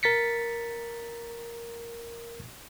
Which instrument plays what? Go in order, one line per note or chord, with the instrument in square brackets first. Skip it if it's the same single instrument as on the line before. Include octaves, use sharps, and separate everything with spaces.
[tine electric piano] A#4 A6 B6 C#7